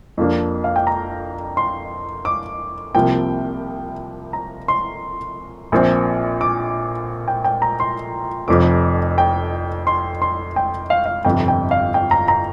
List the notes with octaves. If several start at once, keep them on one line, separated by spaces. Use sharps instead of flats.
F2 F3 A#3 D4
F5
G5
A#5
C6
D6
C2 C3 F3 A#3 G5
A#5
C6
A#1 A#2 F3 C4
D6
G5
G5
A#5
C6
F1 F2 F3 C4 D6
G5
C6
C6
G5
F5
F5
G1 F2 C3 F3 G5
G5
F5
G5
A#5
A#5